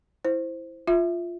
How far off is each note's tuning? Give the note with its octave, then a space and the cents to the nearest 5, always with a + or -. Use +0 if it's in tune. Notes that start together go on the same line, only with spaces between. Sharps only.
E4 +0 C5 +0
F4 +0 E5 +0